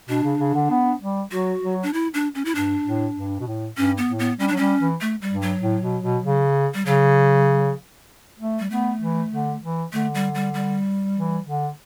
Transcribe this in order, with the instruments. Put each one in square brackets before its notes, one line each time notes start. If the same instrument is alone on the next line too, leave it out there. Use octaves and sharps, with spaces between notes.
[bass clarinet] B2 [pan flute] D4
[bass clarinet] C#3
C#3
D3
B3
G3
[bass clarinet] F#3 [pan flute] F#4
[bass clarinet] F#3
[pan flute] D4
E4
D4
C#4
E4
[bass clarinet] G2 [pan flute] D4
[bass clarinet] A2
G2
B2
A2
[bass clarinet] G2 [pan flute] C#4
[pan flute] B3
[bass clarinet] A2
[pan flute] B3
[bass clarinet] G3 [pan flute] C#4
[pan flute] D4
[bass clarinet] F#3
[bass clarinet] G3 [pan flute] C#4
[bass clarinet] E3
[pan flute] A3
G3
[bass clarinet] G2
[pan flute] F#3
[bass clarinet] A2
B2
B2
C#3
[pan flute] G3
[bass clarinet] C#3 [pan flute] F#3
[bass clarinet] A3
[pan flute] G3
[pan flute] A3 [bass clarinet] B3
[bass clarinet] E3
D3
E3
[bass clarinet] D3 [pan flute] A3
[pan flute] G3
G3
G3
[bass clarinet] E3
D3